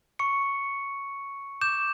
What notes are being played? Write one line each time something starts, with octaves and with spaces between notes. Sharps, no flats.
C#6 C#7
D6 G6 E7